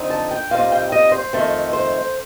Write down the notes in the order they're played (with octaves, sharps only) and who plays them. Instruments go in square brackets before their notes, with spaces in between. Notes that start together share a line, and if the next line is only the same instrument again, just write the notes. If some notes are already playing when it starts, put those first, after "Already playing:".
Already playing: [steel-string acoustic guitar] F2 D3 F3 C4 D#4
A5
G5
A#2 G3 C4 D#4 F5
G5
D#5
C5
F2 D#3 A3 C4
C5